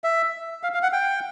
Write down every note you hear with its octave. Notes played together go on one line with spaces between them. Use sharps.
E5
F5
F5
F#5
G5